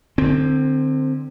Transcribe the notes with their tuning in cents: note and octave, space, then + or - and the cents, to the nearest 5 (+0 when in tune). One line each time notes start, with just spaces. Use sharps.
D3 +30 C4 +0